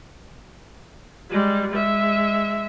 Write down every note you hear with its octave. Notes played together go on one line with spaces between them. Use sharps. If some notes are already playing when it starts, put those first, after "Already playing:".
G3 G#3
G#3 E5